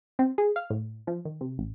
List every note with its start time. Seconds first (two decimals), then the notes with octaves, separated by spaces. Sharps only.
0.19 C4
0.38 G#4
0.56 F5
0.70 A2
1.07 F3
1.25 D#3
1.41 C3
1.58 A1